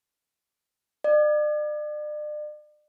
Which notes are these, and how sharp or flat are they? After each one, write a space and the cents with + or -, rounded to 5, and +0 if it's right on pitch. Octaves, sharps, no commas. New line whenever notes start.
D5 +40